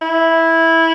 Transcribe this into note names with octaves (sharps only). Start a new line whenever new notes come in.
E4